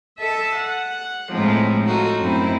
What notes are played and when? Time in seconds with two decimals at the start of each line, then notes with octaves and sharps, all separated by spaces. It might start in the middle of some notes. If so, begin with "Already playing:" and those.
0.18 A4 D#5 E5 A5
0.55 F#5
1.30 A2 F3 G#3 C4 D#4
1.83 D#4 F4 F#4 A4
2.20 F#2 A3 C4 D#4 E4